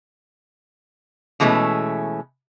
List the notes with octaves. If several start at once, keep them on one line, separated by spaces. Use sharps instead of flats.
B2 E3 G#3 A3 C#4